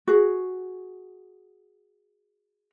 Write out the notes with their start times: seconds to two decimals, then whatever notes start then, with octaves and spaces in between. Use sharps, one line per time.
0.07 F#4 G#4